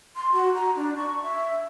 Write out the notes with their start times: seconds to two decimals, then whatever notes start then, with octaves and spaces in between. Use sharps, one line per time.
0.16 C6
0.32 F#4
0.54 A#5
0.76 D4
0.96 C#6
1.23 E5